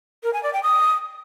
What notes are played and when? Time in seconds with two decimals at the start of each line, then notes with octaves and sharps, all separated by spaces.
0.23 A#4
0.33 G#5
0.43 D5
0.53 G5
0.63 D#6